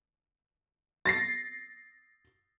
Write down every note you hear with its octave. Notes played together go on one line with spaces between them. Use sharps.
A6 A#6 C7